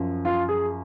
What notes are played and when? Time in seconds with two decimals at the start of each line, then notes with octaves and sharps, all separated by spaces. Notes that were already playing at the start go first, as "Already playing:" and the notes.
Already playing: F#2 F3
0.25 F4
0.49 G#4